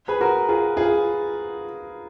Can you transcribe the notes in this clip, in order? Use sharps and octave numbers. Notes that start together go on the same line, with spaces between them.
G#4 B4
F#4 A#4
F4 G#4
F4 G#4